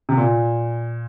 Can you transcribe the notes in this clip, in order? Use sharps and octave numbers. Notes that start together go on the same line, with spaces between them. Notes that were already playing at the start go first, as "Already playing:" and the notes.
C3
A#2